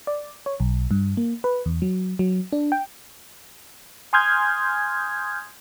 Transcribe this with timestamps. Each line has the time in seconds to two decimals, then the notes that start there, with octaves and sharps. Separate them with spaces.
0.07 D5
0.46 C#5
0.60 B1
0.91 G2
1.17 A#3
1.44 B4
1.66 E2
1.82 F#3
2.19 F#3
2.52 D4
2.72 G5
4.13 G#5 C6 D#6 F6 G6 G#6